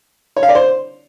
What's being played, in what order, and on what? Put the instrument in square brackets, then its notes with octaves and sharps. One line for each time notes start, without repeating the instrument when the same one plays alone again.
[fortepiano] C#5
F5
D5
C5